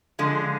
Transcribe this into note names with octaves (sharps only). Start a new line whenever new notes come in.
D3 F3 G#3